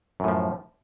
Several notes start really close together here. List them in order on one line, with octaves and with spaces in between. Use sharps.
F#2 A2 F3